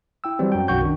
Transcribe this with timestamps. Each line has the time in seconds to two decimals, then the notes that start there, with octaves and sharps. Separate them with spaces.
0.24 E4 G5 E6
0.39 E3 F#3 G3 C4
0.52 F#2 F#3 G5
0.68 B1 F#2 F#4 G5 C#6 G6
0.81 D#3 F#3 D4